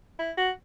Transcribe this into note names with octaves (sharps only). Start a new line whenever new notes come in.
E4
F#4